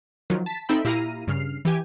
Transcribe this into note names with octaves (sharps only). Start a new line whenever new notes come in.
D#3 F3 F#3
A5 B6
C4 D#4 A4 E5 G5 B5
A#2 E4 G4 F5 A#5 D#7
G2 C#3 F6 C7
E3 G4 G#5